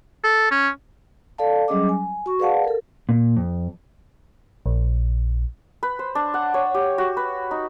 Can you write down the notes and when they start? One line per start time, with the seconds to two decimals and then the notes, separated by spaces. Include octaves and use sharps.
0.24 A4
0.51 C#4
1.38 A4 D5 F5 A5
1.68 F#3 G3 C#4 G#4 D#5 D6
1.89 G#5
2.26 F#4 C#6
2.39 G#4 B4 D5 F5 F#5 A5
2.64 A4 A#4
3.09 A#2
3.37 F2
4.66 A#1
5.83 B4
5.99 C5
6.15 D4
6.34 F#5
6.54 C#5
6.74 G4
6.98 F#4
7.17 B4
7.51 D#4